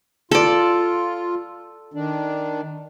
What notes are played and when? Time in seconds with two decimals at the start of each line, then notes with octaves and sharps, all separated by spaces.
0.31 F4 A4 D5
1.94 D#3 D4